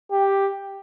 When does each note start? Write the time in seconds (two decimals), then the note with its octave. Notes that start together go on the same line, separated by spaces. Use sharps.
0.12 G4